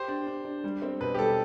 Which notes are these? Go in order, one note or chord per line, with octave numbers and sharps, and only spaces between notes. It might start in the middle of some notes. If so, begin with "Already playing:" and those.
Already playing: G4 C5
D4
D4
D4
G3
C4
B2 B4
G4
G3 A4